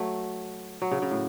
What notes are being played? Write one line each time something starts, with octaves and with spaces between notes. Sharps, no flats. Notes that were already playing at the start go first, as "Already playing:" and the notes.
Already playing: F#3 A3
F#3
C#3
C#3
A2